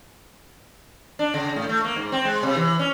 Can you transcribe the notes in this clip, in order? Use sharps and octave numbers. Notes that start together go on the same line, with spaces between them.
D4
C#3
A2
A3
A#3
G#2
C4
G#3
C3
E3
C#4